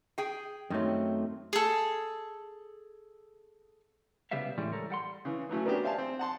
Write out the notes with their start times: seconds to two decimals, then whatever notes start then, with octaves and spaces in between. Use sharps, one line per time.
0.18 G#4 G5
0.70 F#2 D#3 F#3 A3 C4
1.53 G#4 A4
4.31 C2 C#3 G3 B3 E5 F5
4.57 A2 E3 G3 G#3 C#4
4.72 A4 A#4 C#5
4.90 G3 F#5 C6
5.25 C#3 E3
5.49 E3 F#3 A3 C#4
5.66 A#3 B3 C#4 D4 F#4 G4
5.84 C5 E5 F5 G#5 A5
5.98 C4
6.19 F#5 A5 C6